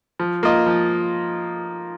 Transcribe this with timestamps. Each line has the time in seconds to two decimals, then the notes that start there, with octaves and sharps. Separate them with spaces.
0.19 F3
0.43 A#3 F4 D#5
0.66 F3